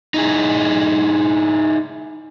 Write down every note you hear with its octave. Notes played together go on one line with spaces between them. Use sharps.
D#4 E4 G#4